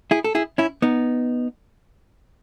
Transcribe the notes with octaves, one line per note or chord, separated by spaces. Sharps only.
E4 G#4
A4
E4 G#4
C#4 E4
B3 D#4